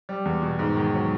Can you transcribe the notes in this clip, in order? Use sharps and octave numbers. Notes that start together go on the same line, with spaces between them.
G3
E2
B2
G#2
D#3
F#3